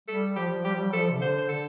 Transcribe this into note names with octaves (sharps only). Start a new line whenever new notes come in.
G3 A4
F3 G4
F3
G3 G4
F3
G3
F3 A4
C3
D3 C5
C5
D3 A4